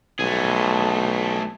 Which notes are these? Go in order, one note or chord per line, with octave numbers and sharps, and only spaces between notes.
B1 A3 G#4